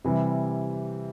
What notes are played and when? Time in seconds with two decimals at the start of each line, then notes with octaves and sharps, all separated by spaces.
0.04 C3 E3 G3